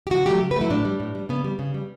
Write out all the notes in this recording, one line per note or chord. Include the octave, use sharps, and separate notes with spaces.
G4
C#3 F#4
F#3 A3 G4
C#3
B4
F#3 A3 E4
A2 D4
G3
A2
G3
C#3 B3
G3
C#3
G3